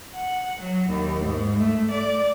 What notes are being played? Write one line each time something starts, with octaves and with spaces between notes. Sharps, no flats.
F#5
F#3
D#2
G#2
A3
D5